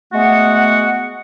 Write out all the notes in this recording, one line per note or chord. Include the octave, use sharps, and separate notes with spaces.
G#3 A3 B3 F#4 F#5